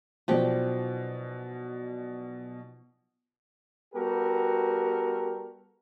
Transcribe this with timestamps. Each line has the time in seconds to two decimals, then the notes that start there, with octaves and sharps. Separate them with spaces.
0.28 B1 B2 F3 G4 D5 G5
3.94 G3 B3 F#4 G4 A4 A#4